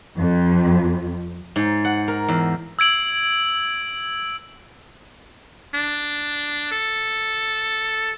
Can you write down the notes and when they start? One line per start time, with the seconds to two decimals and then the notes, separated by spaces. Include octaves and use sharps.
0.18 F2
1.56 G#2
1.85 F#5
2.08 A#4
2.28 E2
2.79 E6 G#6 D7 F#7
5.75 D4
6.72 A4